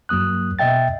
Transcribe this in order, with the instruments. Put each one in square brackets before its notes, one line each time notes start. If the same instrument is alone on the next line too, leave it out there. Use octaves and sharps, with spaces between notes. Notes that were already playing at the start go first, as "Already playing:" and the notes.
[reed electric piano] G2 F#3 A#3 D#6 F#6
B2 D#5 E5 G5 A6